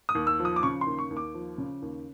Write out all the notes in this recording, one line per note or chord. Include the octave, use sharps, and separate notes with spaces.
D#6
D#2
E6
F3
D#6
D6
C#3 C#6
C6
D#2
C#6
D#2
D6
F3
C#3
D#2